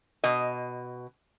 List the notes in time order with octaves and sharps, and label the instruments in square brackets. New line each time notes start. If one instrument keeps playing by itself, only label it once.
[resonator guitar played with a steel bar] B2 D#5